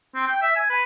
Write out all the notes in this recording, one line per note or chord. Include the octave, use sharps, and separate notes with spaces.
C4
G5
E5
G#5
B4